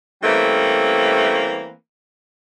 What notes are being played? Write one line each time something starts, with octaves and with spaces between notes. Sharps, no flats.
E3 G3 A3 A#3 C4 C#4